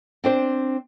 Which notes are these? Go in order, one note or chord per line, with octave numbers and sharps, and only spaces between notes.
C4 D4 C5